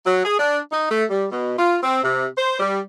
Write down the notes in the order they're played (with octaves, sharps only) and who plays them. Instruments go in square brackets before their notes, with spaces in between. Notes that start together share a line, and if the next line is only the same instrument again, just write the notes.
[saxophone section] F#3
G#4
D4
D#4
A3
G3
B2
F4
C4
C3
C5
G3